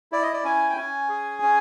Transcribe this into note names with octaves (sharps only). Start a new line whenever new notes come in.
E4 D5
D#5
D5
C#4 G#5
G5
C#4 G#5
G#4
C#4